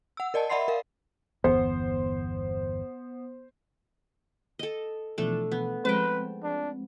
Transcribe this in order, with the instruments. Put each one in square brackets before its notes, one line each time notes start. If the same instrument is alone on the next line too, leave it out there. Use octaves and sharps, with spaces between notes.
[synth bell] F#5 E6
A#4 D5 D#5 A5
D5 E5 F#5 B5 C6 C7
A#4 F5
[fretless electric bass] G1 E2 [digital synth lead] B3 [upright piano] C5
[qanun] A4 D#5
[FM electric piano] B2 E3 F3 [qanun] A3 D4 A4
[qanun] B3
[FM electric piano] F3 G#3 C4 [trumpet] B4 [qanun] G5 A5
[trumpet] D4